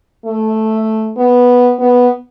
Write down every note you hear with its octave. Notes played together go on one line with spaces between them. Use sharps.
A3
B3
B3